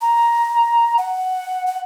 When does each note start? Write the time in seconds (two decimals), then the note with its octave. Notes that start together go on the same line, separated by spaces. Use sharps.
0.02 A#5
0.98 F#5
1.67 F#5